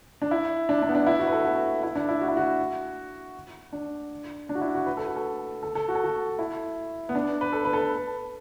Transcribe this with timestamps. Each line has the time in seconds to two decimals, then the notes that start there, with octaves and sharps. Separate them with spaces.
0.22 D4
0.31 E4
0.69 D4
0.82 D4
0.89 B3
0.95 D4
1.07 E4
1.19 F#4
1.27 B4
1.32 A4
1.45 F#4
1.83 E4
1.95 D4
2.09 E4
2.21 F#4
2.28 E4
2.37 F#4
3.73 D4
4.49 D4
4.55 F#4
4.61 E4
4.75 F#4
4.86 B4
4.97 A4
5.06 F#4
5.16 A4
5.63 A4
5.75 A4
5.88 F#4
5.95 A4
6.04 F#4
6.39 E4
7.09 B3
7.15 D4
7.41 B4
7.53 A4
7.65 B4
7.73 A4
7.78 B4